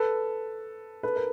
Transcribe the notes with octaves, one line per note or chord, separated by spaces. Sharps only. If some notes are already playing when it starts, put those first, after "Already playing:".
Already playing: A4 B4
A4 B4
A#4